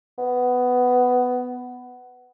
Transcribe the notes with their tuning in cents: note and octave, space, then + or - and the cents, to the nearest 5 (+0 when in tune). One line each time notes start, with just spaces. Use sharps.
B3 +10